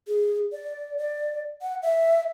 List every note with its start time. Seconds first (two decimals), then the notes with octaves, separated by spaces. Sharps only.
0.08 G#4
0.52 D5
0.98 D5
1.62 F#5
1.83 E5